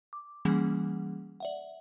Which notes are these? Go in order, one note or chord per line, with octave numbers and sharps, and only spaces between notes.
D6
E3 G3 A#3 C#4 G#4 F#5
D5 E5 F#5